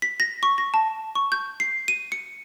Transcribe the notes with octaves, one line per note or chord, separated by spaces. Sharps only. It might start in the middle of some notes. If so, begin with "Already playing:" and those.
B6
A#6
C#6
A#6
A5
C#6
G6
C7
D#7
C#7